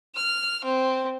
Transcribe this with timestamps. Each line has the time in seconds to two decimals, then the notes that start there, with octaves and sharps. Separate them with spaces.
0.15 F6
0.65 C4